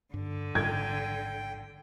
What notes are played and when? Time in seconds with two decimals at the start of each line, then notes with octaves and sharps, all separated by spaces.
0.14 G2 D3
0.55 A1 G#2 G3 G5 G#6